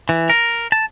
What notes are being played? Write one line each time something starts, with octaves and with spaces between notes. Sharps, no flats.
E3
A#4
A5